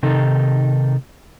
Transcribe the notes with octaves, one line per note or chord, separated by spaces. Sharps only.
C3 D#3 D#4 A4